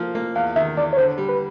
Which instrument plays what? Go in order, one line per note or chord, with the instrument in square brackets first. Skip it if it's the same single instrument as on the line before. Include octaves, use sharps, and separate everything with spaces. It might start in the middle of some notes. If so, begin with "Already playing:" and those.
Already playing: [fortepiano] F3 A#3
A#3
[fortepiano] E2 [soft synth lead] F5
[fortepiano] D#3 [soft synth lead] E5
[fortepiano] E2 [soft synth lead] D5
[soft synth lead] C#5
[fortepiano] D3 [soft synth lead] C5
[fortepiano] G3
[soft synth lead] B4